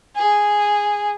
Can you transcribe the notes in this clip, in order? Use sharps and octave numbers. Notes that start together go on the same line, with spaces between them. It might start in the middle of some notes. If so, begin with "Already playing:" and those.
G#4